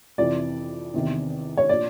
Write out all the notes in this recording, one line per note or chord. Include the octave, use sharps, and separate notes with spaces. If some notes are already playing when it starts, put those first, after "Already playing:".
F2 C3 E3 D5
E2 C3 D#3
C#5
A#2 F3 D5